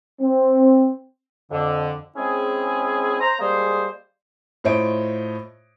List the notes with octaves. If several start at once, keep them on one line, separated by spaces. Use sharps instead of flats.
C4
F2 D3
G#3 C4 C#4 E4 G#4
C5 A#5
G3 G#3 A#3 G#4 C5
A2 F4 C5 C#5 D#5 D7